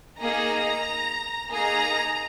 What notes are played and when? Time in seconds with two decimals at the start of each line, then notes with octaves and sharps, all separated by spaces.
0.19 A#3 D#4 G#4 A#5
1.51 A#3 D#4 G#4 A#5